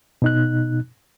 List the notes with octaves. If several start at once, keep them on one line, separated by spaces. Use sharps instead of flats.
B2 D#4 F#6